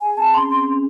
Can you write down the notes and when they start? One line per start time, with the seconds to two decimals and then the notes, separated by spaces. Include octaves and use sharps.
0.01 G#4 G#5
0.17 C4 A5
0.34 C#4 C6
0.50 C4 C6
0.66 C#4